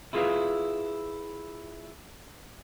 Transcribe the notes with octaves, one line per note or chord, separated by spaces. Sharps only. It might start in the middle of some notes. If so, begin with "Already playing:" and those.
E4 F4 G#4 B4 F5